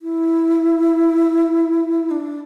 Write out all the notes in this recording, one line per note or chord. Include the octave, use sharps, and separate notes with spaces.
E4
D4